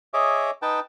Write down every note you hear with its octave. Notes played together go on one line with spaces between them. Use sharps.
G#4 C#5 D#5 E5 D6
D#4 B4 G5 A5